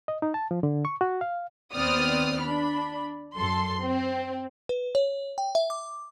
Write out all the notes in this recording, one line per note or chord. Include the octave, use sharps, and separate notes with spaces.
D#5
D#4
A5
F3
D3
C#6
F#4
F5
D#2 B3 C4 D5 D#6 F6
D4 B5
F#2 A4 C6
C4
B4
C#5
G5
E5
D6